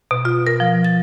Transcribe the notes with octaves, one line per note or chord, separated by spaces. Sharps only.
B2
F4
A#4
F3
A6